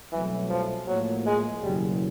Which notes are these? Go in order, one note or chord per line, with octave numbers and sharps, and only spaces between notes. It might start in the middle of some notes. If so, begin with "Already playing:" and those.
C2 B2 E3 F#3 A3
F3
A2 F3 F#3 A#3
G#3
F#1 E2 B2 F#3 G3